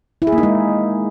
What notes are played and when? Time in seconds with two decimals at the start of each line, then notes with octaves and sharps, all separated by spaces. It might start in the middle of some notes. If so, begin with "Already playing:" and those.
0.22 E4
0.27 G#4
0.32 A#3
0.38 D#4
0.43 G#3